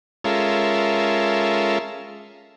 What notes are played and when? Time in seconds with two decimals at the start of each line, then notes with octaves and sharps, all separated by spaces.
0.24 G#3 C#4 F4 A4 A#4 E5